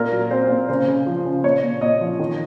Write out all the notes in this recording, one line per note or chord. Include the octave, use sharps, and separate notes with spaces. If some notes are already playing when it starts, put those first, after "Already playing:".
Already playing: A#2 A#3 A#4
F#3
C4 C5
A#2
C#3 C5
C#3
F3
C#3
A#2 C#5
A#2
A#2 D#5
F3
D#3